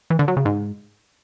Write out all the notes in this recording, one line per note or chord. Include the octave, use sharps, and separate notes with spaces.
E3
D3
F#3
C#3
G#2